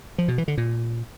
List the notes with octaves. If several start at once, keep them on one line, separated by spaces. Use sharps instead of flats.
F3
B2
E3
D3
A#2